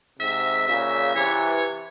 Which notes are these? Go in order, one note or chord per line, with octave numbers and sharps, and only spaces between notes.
G#2 C3 E5
A#2 C#3 E5
C3 E3 C#5